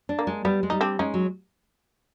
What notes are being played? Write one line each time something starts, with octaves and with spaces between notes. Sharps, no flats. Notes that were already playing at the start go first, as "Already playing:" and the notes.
D4
A#3
G#3
G3 B3
G#3
G3 D#4
C4 D4
G#3 C#4 D#4
F#3